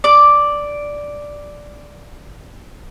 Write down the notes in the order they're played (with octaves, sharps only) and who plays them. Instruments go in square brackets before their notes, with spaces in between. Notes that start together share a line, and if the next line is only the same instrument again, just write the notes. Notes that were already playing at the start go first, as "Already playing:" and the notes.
[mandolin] D5 D6